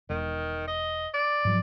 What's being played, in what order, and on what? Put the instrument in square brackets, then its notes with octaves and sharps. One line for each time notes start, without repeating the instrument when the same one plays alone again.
[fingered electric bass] E1 [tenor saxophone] D#3
[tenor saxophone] D#5
D5
[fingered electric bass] G#2 F3 F#3